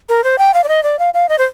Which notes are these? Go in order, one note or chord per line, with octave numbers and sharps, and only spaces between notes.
A#4
C5
G5
F5
D5
D#5
D5
F5
F5
D#5
C5